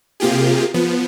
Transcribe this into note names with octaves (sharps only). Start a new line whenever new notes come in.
C3 A#3 F4 G4 G#4
F3 B3